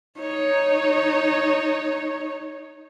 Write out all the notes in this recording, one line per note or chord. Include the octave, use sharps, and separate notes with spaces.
D#4 C#5